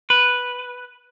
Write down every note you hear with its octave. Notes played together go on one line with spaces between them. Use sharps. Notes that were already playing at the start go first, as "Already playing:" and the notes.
B4